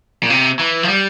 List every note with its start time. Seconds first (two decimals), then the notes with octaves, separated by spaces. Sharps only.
0.23 A#2
0.30 C3
0.59 E3
0.83 F3
0.88 G3